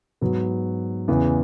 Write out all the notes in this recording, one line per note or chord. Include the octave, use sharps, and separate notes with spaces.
G#2 F#3 B3
E2 C#3 E3 B3